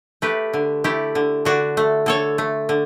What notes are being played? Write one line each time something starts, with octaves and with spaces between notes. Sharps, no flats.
A3 G4 B4
D3
A3 E4 G4
D3
D3 D4 F#4
A3
D3 A4 C#5
A3
D3